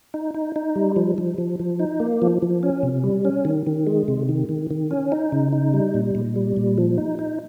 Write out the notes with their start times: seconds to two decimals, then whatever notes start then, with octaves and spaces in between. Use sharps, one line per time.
0.14 D#4
0.34 D#4
0.56 D#4
0.76 G3
0.96 F3
1.18 F3
1.38 F3
1.59 F3
1.79 D#4
2.00 A#3
2.22 F3
2.42 F3
2.63 C#4
2.83 C3
3.04 G3
3.25 C#4
3.45 D#3
3.67 D#3
3.87 G#3
4.08 C3
4.29 D#3
4.49 D#3
4.70 D#3
4.91 C#4
5.12 D#4
5.32 C#3
5.52 D#4
5.73 G3
5.94 A#2
6.15 A#2
6.36 G3
6.57 A#2
6.78 F3
6.98 D#4
7.19 D#4